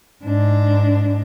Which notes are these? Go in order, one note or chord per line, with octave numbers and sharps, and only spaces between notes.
G#2 D4